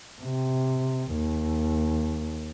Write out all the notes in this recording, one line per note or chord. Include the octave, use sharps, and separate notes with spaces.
C3
D#2